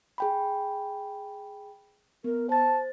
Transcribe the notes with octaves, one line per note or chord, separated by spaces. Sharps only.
G#4 G5 B5
B3 A#4
C5 A5 A6